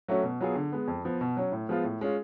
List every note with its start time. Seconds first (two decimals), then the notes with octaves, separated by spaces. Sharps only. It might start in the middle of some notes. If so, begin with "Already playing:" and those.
0.08 F#3 A3 C#4 F#4
0.23 B2
0.41 F#3 B3 F4 G#4
0.56 D3
0.72 G#3 B3
0.88 F2
1.05 F3 B3
1.21 B2
1.37 F#3 C#4
1.52 A2
1.69 F3 G#3 B3 F4
1.84 A2
2.01 G#3 C#4 F4